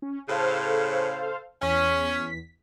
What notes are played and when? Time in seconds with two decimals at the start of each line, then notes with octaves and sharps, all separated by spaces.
0.02 C#4
0.29 A2 C#3 A4 C5 F5
1.62 E2 C#4 B6